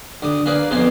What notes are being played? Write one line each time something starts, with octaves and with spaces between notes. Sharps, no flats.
D2 D6 D#6
A#3 G#4 B4 D5
B1 F2 B2 G#5 C6